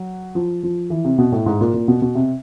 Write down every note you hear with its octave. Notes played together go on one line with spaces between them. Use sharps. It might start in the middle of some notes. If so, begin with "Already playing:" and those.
Already playing: F#3
F3
F3
E3
C3
B2
A2
G#2
A#2
A#2
B2
B2
C3